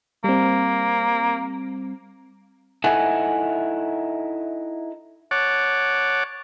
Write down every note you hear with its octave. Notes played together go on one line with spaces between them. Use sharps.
G3 A#3 C4
D#4 E4 A4 E5 F#5 G#5
C#5 F#5 A5 D6